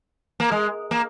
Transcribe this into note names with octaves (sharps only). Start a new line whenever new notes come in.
A#3
G#3
A#3